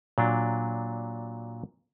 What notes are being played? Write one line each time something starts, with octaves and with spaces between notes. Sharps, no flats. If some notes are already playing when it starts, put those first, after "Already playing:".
A#2 F#3 D4